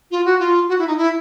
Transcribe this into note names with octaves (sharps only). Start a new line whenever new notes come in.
F4
F#4
F4
F#4
E4
D#4
E4